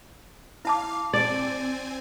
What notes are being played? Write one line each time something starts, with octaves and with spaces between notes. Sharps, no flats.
E4 F5 A5 D6
C4 D5 G#5